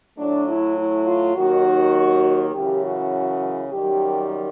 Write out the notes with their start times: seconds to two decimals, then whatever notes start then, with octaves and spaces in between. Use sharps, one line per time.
0.18 A2 F#3 A3 D4
0.48 E4
0.77 E4
1.06 F4
1.35 D#2 D#3 F#3 F#4
2.53 F#2 C#3 E3 G4
2.84 F#4
3.72 F#2 D#3 G3 G4